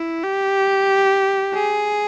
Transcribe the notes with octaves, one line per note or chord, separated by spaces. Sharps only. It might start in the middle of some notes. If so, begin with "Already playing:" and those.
Already playing: E4
G4
G#4